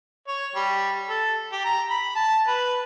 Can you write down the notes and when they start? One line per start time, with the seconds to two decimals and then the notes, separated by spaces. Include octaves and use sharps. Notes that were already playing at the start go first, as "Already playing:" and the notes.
0.28 C#5
0.55 G3
1.09 A4
1.52 G4
1.65 A#5
1.90 B5
2.15 A5
2.47 B4